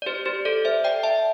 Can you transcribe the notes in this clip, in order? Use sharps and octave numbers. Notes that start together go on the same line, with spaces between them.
D5
G4 C5
G4 C5
A4 D5
C5 E5
D5 G5
E5 A5